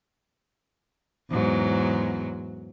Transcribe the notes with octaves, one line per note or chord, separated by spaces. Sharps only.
E2 G#2 F#3